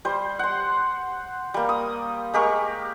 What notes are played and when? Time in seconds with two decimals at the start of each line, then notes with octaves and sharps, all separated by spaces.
0.05 G3 C5
0.39 F#5 C6
1.54 G3 A#3
1.69 D#6
2.34 G#3 G4 A#4 C#6